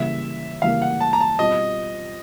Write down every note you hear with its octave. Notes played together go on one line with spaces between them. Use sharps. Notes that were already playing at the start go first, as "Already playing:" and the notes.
Already playing: C#3 E3 G3 A#3 E5
C#3 E3 G3 A#3 F5
F#5
A5
A#5
A5
B2 G3 C4 F4 D#5